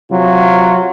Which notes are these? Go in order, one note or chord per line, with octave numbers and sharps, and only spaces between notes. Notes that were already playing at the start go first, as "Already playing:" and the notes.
C3 F#3 F4